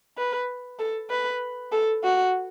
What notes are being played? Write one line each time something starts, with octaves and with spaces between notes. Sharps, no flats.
B4
A4
B4
A4
F#4